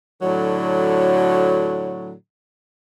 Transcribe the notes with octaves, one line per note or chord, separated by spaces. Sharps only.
A2 D3 F#3